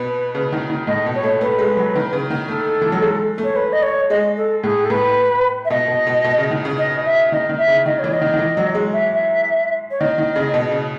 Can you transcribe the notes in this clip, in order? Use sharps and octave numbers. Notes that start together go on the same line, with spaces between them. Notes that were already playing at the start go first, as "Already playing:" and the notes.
Already playing: B2 B4
C#3
D#3
D#3
A2 D#5
B2
C#5
A3
A3 B4
G#3
F#3
D#3
C#3
D#3
A3 A4
E3
F#3
G#3
A3
C#5
B4
D#5
C#5
G#3 D#5
A4
A2 G#4
A4
A2 B4
E5
B2 D#5
B2
B2
B2
C#3
D#3
C#3
D#5
E5
D#3 D#5
D#3
E5
C#3
D#3 D#5
E3 C#5
D#5
D#3
D#3
E3
F#3
G#3
E5
E5
C#5
D#3 D#5
D#3
C#3
B2
C#3